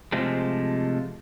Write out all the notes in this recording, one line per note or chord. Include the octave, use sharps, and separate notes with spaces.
C3 F3 G#3 A3